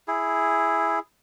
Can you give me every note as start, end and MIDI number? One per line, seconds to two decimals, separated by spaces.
0.08 0.99 64
0.08 0.99 68